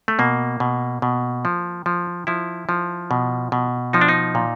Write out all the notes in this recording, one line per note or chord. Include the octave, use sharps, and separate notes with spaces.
A3
B2 A#3
B2
B2
F3
F3
F3 E4
F3
B2
B2
F3 D#4
D4
D#4
A#2